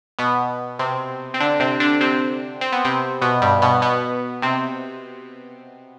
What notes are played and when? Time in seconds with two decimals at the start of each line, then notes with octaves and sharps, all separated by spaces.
0.19 B2 B3
0.79 C3 C4
1.34 C4
1.40 D3 D4
1.60 C3 C4
1.80 D3 D4
2.01 C3 C4
2.61 C4
2.72 B3
2.85 C3 C4
3.21 B2 B3
3.42 G2 G3
3.62 B2 B3
3.82 B2 B3
4.42 C3 C4